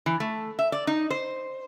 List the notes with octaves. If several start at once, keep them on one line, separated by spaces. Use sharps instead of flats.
E3
A3
E5
D5
D#4
C5